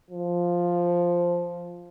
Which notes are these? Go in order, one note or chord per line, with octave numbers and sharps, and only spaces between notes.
F3